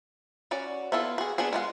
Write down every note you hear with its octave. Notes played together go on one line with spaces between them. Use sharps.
C#4 F#4 D5
B3 E4 F4 A4
F#4 G#4
B3 D4 F#4 G#4
G#3 F4 F#5